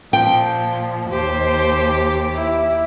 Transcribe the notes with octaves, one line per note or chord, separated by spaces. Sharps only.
A#2 F3 G5
D#2 G4 C5
E4